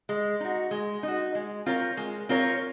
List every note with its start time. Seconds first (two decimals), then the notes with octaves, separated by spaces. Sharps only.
0.09 G#3
0.40 D#4 F#4
0.71 G#3
1.03 D#4 F#4
1.35 G#3
1.66 C4 F4 A#4 C#5
1.97 G#3
2.29 C4 F4 A#4 C#5